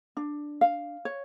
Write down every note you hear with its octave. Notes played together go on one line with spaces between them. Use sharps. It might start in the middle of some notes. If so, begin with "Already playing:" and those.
D4
F5
C#5